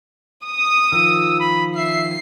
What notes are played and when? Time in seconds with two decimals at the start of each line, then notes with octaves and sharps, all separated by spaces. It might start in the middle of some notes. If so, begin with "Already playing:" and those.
0.47 D#6
0.92 D#3 F3 E6
1.40 B5
1.76 E5 C7